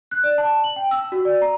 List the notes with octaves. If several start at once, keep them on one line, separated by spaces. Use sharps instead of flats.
F#6
D5
A5
F#7
G5
E6
F#4
D5
A#5